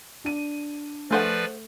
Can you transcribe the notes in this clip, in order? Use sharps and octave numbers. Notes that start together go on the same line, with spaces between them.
D4 D#7
F3 A3 G#4 B4 C5 D5 F#5